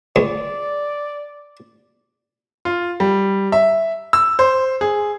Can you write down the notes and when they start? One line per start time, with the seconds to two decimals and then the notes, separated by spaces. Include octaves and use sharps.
0.16 C#2 D5
2.65 F4
3.00 G3
3.52 E5
4.13 E6
4.39 C5
4.81 G#4